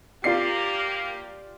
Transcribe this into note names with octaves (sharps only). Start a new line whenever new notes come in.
A#3 F4 G4 D5 C7